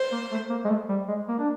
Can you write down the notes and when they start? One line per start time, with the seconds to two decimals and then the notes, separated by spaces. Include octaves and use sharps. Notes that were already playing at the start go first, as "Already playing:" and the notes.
Already playing: C5
0.12 A#3
0.32 A3
0.50 A#3
0.65 G#3
0.69 A3
0.89 G3
1.08 G#3
1.29 A#3
1.39 D4